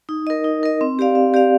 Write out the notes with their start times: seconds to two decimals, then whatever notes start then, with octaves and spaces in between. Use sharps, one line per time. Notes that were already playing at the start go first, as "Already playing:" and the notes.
0.09 D#4
0.27 A#4 D#5
0.44 D#4
0.63 A#4 D#5
0.81 C4
0.99 G4 D5 F5
1.15 C4
1.34 G4 D5 F5